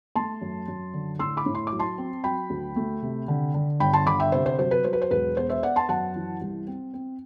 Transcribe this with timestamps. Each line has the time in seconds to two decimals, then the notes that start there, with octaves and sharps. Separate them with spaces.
0.16 A3 A5 C6
0.41 F#2
0.68 F#2
0.94 D3
1.19 A2 C6 E6
1.37 B5 D6
1.46 A2
1.55 C6
1.67 D6
1.72 F#3
1.79 A5 C6
1.98 C4
2.24 F#3 G5 B5
2.50 D2
2.76 A3
3.02 C3
3.28 D3
3.54 D3
3.80 G1 G5 B5
3.93 A5 C6
4.07 D3 B5 D6
4.20 E5 G5
4.32 C3 C5 E5
4.46 C5
4.59 F#3 C5
4.71 B4
4.84 F#3 C5
4.93 B4
5.02 C5
5.11 E1 B4
5.37 B3 C5
5.49 C5 E5
5.63 B3 D5 F#5
5.76 A5 C6
5.89 F#2 F#5 A5
6.15 E3
6.42 C2
6.67 C4
6.94 C4